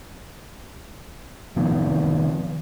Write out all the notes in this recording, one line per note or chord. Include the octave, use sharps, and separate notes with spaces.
C3 D#3 F3 B3